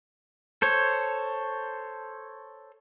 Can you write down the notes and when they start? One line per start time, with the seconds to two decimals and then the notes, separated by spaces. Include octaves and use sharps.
0.62 A4 C5 C#5